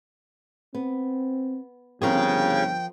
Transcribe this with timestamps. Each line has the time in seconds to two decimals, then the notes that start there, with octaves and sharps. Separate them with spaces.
0.75 B3 C4
2.02 G1 F3 C4 G#4 A#4 C#5 G5